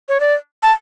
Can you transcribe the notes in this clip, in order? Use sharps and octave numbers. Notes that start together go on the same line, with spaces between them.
C#5
D5
A5